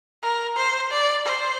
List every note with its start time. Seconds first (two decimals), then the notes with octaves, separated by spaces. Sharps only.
0.22 A#4
0.56 C5
0.91 D5
1.25 C5